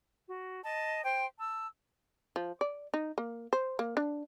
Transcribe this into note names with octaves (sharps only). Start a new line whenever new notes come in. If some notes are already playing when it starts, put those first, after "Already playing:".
F#4
D#5 A5
C5 G5 C6
A5 E6
F3
D5
D#4
A#3
C5
A#3
D4